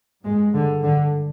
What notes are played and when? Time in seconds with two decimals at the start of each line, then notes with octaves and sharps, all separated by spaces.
0.24 G2 G#3
0.54 D3
0.83 D3